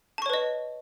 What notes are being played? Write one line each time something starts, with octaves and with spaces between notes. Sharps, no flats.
B4 C#5 D#5 A5 C#6